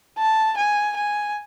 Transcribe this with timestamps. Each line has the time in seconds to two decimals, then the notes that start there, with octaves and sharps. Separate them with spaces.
0.18 A5
0.57 G#5
0.96 G#5